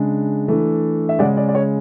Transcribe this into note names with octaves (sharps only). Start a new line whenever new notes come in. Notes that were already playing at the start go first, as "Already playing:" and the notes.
Already playing: C#3 G#3 D4
E3 A3 D4
E5
C#3 G#3 C#4 D5 F#5
D5
D5
C#5